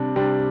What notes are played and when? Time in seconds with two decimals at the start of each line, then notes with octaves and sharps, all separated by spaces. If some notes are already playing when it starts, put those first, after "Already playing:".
Already playing: C3 G3 D4
0.16 C3 G3 D4